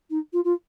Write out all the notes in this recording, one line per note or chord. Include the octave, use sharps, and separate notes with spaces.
D#4
F4
F4